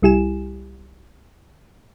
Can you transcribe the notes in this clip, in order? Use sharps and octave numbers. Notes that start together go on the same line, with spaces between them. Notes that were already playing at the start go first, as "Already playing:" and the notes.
C2 G3 E4 G4 G#5 E7